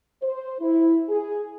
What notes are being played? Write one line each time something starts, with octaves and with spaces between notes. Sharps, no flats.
C5
E4
G#4